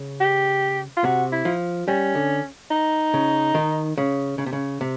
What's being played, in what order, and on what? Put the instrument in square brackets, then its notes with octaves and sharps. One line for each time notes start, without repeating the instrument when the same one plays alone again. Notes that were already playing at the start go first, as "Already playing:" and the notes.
Already playing: [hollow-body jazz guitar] C#3
[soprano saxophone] G4
F4
[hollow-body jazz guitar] C3 [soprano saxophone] F#4
[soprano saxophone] E4
[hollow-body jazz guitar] F3
[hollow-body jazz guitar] G3 [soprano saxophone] C#4
[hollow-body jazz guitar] D3
[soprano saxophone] D#4
[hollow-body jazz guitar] C#3
D#3
C#3
C#3
C3
C#3
C3